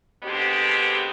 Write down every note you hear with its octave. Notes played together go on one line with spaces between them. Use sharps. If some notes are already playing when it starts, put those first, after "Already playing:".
B2 D3 G#3 B3 C4 G4